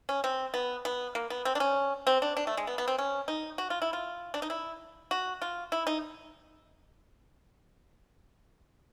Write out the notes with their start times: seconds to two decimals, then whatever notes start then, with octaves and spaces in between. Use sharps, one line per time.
0.09 C#4
0.24 C4
0.54 B3
0.85 B3
1.15 A#3
1.30 B3
1.45 C4
1.55 D4
1.60 C#4
2.07 C4
2.22 D4
2.37 D4
2.47 A3
2.57 G#3
2.67 B3
2.78 B3
2.88 C4
2.98 C#4
3.28 D#4
3.58 F#4
3.70 F4
3.82 E4
3.93 F4
4.34 D4
4.42 D#4
4.50 E4
5.11 F#4
5.42 F4
5.72 E4
5.87 D#4